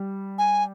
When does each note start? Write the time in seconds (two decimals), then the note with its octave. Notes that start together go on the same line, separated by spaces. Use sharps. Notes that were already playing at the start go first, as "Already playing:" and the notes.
Already playing: G3
0.38 G#5